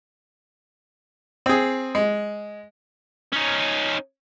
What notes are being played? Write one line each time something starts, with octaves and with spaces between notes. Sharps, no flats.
C4 G#4
G#3
C#4 D#4